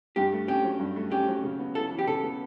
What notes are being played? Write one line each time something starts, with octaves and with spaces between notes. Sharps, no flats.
G2 G4
A3
C#4 G4
F#3
G2
A3
C#4 G4
F#3
C#3
B3
E4 A4
E3
G4
C#3 A4
B3